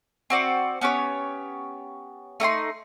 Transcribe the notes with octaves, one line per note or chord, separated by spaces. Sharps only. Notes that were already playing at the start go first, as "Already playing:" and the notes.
C4 F#4 D5
B3 C#4 G4 C#5
A3 D#4 G5 C6